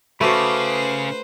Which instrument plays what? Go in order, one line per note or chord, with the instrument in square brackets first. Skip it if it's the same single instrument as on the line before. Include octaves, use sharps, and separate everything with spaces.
[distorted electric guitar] C#3 [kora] A3 F#4 [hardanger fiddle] B4 C5 [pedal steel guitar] B5 D6